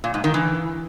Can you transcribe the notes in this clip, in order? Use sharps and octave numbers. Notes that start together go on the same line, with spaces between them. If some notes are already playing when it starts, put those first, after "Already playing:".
A#2
G#2
D#3
E3